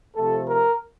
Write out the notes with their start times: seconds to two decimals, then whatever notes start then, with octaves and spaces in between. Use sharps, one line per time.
0.15 C3 F3 A3 A4
0.48 A#4